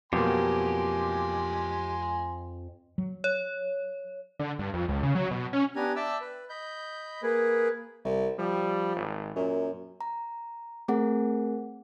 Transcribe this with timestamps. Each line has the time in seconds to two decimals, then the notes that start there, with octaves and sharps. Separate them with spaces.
0.13 F2 B2 F#3 A#3 G4 G#5 C6
2.98 F#3
3.24 C#5
4.40 D3
4.59 G2
4.74 F2
4.88 C#2
5.03 C#3
5.15 F#3
5.31 B2
5.53 C#4
5.76 B3 D4 G4 G#5 A#5
5.96 D5 E5 G5 A5 D6 E6
6.21 B4
6.50 D#5 B5 G6
7.23 A#3 G#4 B4
8.05 C2
8.39 F3 G3
8.96 G#1
9.36 F#2 A#2
10.01 A#5
10.88 A3 C4 G#4 A#4 F#5